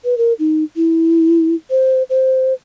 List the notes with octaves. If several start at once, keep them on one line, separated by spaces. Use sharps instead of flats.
B4
A#4
D#4
E4
C5
C5